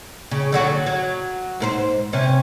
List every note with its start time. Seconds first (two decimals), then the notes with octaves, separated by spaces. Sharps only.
0.31 C#3
0.52 D3 F#3 F#4
0.86 F#3
1.60 G#2 A#4 C5
2.13 C3 C#4